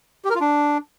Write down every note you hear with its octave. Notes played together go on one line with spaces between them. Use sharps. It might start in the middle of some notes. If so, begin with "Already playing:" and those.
G4
A#4
F4
D4